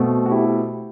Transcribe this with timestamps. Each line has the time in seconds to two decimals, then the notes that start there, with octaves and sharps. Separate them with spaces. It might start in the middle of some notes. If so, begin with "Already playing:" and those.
Already playing: B2 A3 C4
0.26 F#4
0.31 E4 G4